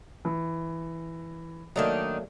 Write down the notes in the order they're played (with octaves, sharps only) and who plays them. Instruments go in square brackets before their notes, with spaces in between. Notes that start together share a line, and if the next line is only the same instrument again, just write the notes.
[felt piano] E3
[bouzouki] D#3 D4 D#4 [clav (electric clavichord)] F#3 A3 A#3